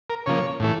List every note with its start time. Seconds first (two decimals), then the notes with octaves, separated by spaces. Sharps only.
0.10 A#4
0.26 C#3 F3 A#3 C#5
0.60 A2 E3 A3